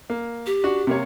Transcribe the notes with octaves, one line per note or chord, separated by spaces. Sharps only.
A#3
G4
D4 F#4
C3 A#3 C#5